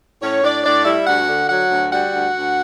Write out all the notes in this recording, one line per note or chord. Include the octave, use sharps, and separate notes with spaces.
A2 C#4 C#5
A2 D4 D5
A2 D4 D5
G3 E4 E5
D2 F#4 F#5
D3
F#3 F#4 F#5
D2
G3 F#4 F#5
D2
D2